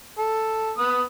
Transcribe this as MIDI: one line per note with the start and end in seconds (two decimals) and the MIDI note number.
0.18 0.71 69
0.78 1.02 59
0.78 1.02 71
0.78 1.02 87